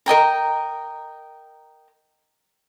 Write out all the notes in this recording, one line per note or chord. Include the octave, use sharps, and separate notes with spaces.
A#4 D#5 G5 A#5